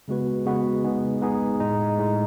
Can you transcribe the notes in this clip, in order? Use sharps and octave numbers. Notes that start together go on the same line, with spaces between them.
C#3 G#3 B3 F#4 B4
C#3 G#3 B3 F#4 B4
G#3 B3 D#4 G#4
G#3 B3 D#4 G#4
A2 G#3 D#4
A2 G#3 D#4